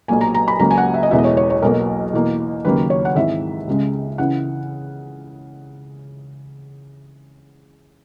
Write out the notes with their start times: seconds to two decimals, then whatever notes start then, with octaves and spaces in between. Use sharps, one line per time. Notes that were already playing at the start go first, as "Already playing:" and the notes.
0.08 B1 A#2 F#3 A#3 G#5
0.21 A#5
0.34 A#5
0.48 B5
0.59 C#2 C#3 F#3 A#3 A#5
0.71 G#5
0.78 F#5
0.94 E5
1.03 D#5
1.11 E1 E2 B2 G#3 E5
1.18 D#5
1.24 C#5
1.37 C#5
1.50 C#5
1.62 B1 B2 F#3 A#3 A#4
2.13 E2 B2 A#3
2.65 D#2 C#3 F#3 A#3 B4
2.90 C#5
3.05 F#5
3.16 G#1 G#2 E3 G#3 E5
3.67 C#2 C#3 G#3
4.18 C#3 E3 F#5